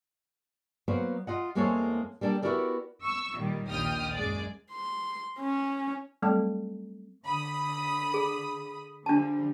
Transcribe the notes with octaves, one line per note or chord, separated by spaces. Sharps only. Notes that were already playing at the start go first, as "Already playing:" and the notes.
F#3 A#3 B3 F#4 C5 D5
F4 D#5 F#5
E2 G#3 A#3 C4 A4 C#5
G3 A#3 D4 A4 G5
B3 E4 F#4 G4 A#4 D5
C#6 E6
A#2 D#3 G3
A#1 D#2 A#2 G5 D#6 F6
F#2 G#3 G#4 D5
C6
C#4
F#3 G3 A3 C4 A4 A5
D3 B5 D#6
G#4
D3 F3 G3 D4 A5